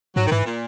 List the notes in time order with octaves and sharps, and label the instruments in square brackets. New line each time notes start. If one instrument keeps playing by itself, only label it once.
[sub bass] G#2 [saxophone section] F#3
[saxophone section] D#3
[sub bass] G#2 [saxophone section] E3
[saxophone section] A#2